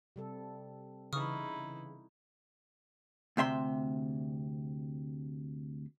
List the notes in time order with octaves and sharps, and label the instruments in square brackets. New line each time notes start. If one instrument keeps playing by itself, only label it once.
[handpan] C3 G3 A4
[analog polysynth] C#3 E3 [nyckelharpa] D#4 E4 [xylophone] C#6 D#6 F6
[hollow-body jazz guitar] D2 C3 E5 C6